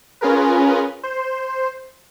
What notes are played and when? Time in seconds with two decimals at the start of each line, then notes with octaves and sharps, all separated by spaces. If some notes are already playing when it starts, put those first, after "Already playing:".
0.21 C#4 F4 G#4 A#4 B4
1.03 C5